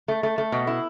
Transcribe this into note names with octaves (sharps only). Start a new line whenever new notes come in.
A3
A3
A3
B2
E4